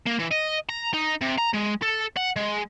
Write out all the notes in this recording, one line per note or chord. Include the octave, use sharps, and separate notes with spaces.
A#3
E3
D#5
A#5
D#4
C3
A#5
G#3
A4
F#5
G#3